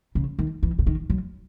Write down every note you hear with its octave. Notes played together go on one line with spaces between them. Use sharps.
C#3
D#3
E3
C#3
D#3
F#3